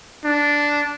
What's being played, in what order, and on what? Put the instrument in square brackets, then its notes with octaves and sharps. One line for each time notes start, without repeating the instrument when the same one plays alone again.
[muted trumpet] D4